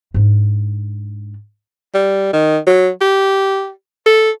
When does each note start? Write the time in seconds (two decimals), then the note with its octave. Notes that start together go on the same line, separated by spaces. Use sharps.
0.14 G#2 D4
1.94 G3
2.33 D#3
2.67 F#3
3.01 G4
4.06 A4